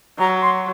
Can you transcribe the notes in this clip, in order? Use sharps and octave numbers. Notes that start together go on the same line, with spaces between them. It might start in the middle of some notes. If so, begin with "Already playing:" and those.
F#3 A#5
C6